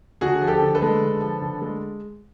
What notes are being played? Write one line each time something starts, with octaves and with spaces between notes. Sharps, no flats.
D3 F#4 G#4
F3
G4 A4
D3
A4 B4
G#3
D3
F3
D3
G#3